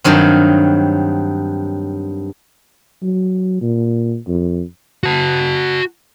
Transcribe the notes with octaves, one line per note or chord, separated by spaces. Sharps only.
G2 D#3 F#3 C4
F#3
A#2
F2
F#4 A5